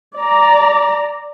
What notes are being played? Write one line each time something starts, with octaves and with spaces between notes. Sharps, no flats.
D5 A#5